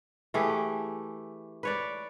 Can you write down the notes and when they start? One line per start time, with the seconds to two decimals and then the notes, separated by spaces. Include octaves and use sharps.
0.34 E3 A3 G4 G#4
1.63 B4 C#5 D5